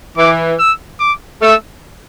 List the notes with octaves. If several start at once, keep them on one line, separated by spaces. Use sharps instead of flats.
E3 D6
E6
D6
A3 E6